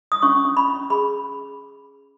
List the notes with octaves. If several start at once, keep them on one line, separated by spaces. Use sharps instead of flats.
D#6
C#4 C#6
C#4
B5
C#4
G#4 B5